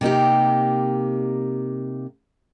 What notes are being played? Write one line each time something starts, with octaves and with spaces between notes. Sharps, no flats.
C3 A#3 D#4 G4